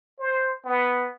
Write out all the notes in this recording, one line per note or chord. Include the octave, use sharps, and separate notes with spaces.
C5
B3